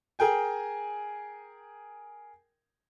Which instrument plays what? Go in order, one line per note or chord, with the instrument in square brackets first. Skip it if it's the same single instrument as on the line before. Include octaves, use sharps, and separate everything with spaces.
[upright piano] G#4 A#4 G5 G#5